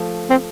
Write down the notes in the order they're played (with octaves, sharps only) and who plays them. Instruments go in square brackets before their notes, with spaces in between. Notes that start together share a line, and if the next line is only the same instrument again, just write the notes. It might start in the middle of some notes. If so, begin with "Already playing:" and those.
Already playing: [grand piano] F3 A3
[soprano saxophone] C4